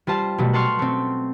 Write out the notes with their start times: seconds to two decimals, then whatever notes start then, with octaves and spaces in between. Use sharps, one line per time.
0.07 G3 F4 C5 A5
0.38 B2 F#3 G3 A3
0.53 F#5 A5 C6 C#6 F6
0.79 A3 C4